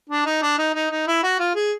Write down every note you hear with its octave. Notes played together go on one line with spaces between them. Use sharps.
D4
D#4
D4
D#4
D#4
D#4
E4
F#4
F4
G#4